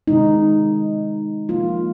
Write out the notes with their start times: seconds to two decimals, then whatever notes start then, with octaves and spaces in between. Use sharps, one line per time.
0.08 C3 D#3 G#3 D#4
1.48 C3 F3 A#3 F4